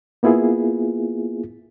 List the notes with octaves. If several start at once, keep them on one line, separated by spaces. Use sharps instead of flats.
A#3 B3 E4 F4 G#4